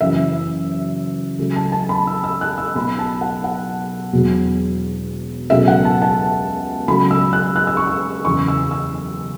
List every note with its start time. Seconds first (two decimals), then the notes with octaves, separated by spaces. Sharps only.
0.01 F#1 F#2 E3 E5
1.38 C#2 C#3 F#3 A3
1.56 A5
1.72 A5
1.89 B5
2.07 E6
2.24 E6
2.41 F#6
2.58 E6
2.75 B1 B2 F#3 A3 B5
2.99 A5
3.21 F#5
3.44 F#5
4.13 E1 E2 B2 F#3
5.50 C#2 B2 F#3 A3 E5
5.68 F#5
5.85 A5
6.02 A5
6.88 C#2 C#3 F#3 A3 B5
7.11 E6
7.33 F#6
7.56 F#6
7.67 E6
7.77 C#6
7.87 E6
8.25 F#1 E2 C#3 E3 C#6
8.48 E6
8.71 E6